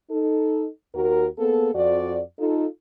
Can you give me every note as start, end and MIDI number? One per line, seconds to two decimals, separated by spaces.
0.10 0.66 63
0.10 0.66 69
0.94 1.26 39
0.94 1.26 66
0.94 1.26 70
1.38 1.69 58
1.38 1.69 59
1.38 1.69 68
1.38 1.69 69
1.75 2.20 41
1.75 2.20 66
1.75 2.20 74
2.39 2.66 63
2.39 2.66 65
2.39 2.66 69